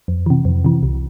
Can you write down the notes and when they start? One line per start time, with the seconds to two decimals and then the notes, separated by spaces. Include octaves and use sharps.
0.08 F2
0.26 C3 E3
0.45 F2
0.64 C3 E3
0.83 C2